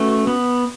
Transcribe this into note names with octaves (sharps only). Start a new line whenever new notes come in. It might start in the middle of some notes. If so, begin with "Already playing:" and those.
Already playing: A3 C#4 F#4 B4
B3